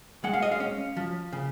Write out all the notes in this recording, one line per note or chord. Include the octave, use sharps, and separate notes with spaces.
G#3 F#5
F5
D#5
F5
C#4
F3
C#3